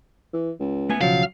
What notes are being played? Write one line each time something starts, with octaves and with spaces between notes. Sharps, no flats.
E3
C#2
A3 B3 G#5
B1 C#3 F3 F#3 F5